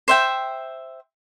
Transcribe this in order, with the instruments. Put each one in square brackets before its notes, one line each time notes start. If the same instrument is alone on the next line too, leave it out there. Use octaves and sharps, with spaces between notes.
[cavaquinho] C5 E5 G5